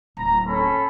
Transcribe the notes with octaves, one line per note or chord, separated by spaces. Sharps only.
D1 A#5
C#4 A4 B5